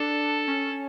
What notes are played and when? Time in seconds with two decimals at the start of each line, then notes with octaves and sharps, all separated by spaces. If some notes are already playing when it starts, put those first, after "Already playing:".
Already playing: D4 A4
0.48 C#4